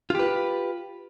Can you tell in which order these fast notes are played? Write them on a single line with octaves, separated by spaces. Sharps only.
F4 G4 B4